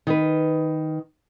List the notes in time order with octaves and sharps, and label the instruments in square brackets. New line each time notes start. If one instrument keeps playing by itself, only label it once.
[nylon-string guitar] D#3 B4